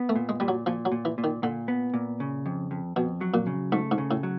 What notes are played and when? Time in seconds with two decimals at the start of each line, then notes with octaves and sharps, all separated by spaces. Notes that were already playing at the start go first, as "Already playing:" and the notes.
Already playing: B3
0.09 A3
0.15 A#2
0.29 G#3
0.40 A#2 G3
0.48 F#3
0.66 A#2 F3
0.85 F#3
0.92 A#2
1.05 E3
1.18 A#2
1.24 D#3
1.43 A#2 D3
1.68 B3
1.94 A#2
2.20 C#3
2.46 F2
2.71 F2
2.96 F2 B2
3.21 F#3
3.34 A#2
3.47 C#3
3.72 G#2 A3
3.91 G#2
3.98 C#3
4.11 A2
4.23 F#3